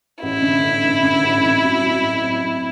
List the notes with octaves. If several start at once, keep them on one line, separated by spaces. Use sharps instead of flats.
A1 E4
D3
A1
G2
D3
A1
C4
F#3
F#3
A2
C4
F#3